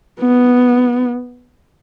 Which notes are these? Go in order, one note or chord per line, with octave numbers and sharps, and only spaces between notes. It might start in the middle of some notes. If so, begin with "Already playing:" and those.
B3